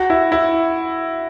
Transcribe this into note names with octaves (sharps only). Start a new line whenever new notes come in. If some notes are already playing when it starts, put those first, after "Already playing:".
Already playing: F#4
E4
E4